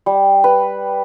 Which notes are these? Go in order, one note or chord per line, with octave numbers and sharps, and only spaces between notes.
G3
B4